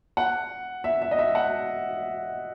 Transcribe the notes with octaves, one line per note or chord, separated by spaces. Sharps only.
F#5
E5
E5
D#5
E5
F#5